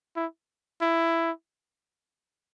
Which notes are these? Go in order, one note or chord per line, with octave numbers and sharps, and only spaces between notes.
E4
E4